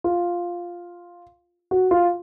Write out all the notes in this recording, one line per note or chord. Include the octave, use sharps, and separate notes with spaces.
F4
F#4
F4